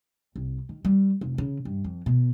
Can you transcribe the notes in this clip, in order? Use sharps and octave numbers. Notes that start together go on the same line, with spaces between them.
C2
D#3
G3
F1
C#3
G2
F2
B2